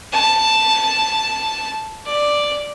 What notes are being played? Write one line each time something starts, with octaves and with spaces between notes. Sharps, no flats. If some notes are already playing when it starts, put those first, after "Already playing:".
A5
D5